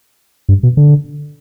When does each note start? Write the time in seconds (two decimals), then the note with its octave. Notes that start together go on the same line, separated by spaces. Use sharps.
0.49 G2
0.63 B2
0.77 D3